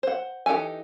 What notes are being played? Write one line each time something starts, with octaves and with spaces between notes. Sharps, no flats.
C5 F#5
E3 D#4 G4 A4 G#5